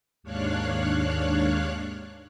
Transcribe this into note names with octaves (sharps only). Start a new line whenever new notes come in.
D#2 G#2 D4 C#5 F5 F#6